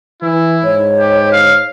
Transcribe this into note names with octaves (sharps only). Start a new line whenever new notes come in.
E3 E4
G#2 C#5
G4
F5